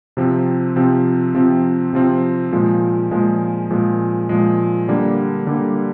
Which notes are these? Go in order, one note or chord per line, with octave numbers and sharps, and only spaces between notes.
C3 F3 C4
C3 F3 C4
C3 F3 C4
C3 F3 C4
A#2 F3 G#3
A#2 F3 G#3
A#2 F3 G#3
A#2 F3 G#3
D3 G3 A#3
D3 G3 A#3